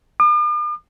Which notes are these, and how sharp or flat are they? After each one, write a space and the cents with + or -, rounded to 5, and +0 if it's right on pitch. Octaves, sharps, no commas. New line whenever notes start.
D6 +45